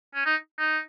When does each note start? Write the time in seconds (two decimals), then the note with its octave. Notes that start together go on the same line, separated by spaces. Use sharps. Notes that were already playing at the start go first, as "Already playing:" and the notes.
0.14 C#4
0.26 D#4
0.59 D#4